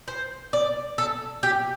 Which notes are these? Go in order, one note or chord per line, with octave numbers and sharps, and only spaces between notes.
C5
D5
A4
G4